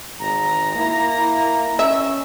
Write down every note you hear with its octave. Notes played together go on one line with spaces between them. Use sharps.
G#1 A#5
A#3 E4
E4
C#4 E5